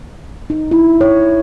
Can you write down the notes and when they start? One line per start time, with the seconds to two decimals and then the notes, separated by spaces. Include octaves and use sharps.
0.50 D#4
0.71 E4
1.01 C#5